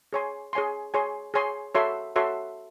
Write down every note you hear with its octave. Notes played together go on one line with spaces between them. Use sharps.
G#4 C#5 G#5 C6
G#4 C#5 G#5 C6
G#4 C#5 G#5 C6
G#4 C#5 G#5 C6
F#4 A4 C#5 E5 C6
F#4 A4 C#5 E5 C6